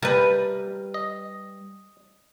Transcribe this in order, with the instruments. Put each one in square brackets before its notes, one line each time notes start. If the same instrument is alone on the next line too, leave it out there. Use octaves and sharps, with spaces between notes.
[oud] G3 B4 [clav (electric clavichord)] A#4 E5 A5
[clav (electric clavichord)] D#5